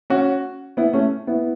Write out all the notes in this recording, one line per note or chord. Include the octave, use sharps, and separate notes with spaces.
C#4 F#4
B3 E4
A3 C#4
B3 E4